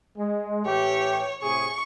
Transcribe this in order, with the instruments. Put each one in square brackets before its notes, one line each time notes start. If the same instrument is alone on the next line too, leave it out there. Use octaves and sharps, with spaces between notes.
[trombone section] G#3
[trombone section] A2 E3 G4 [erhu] C#5
[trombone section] A2 C3 G#4 [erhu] C#6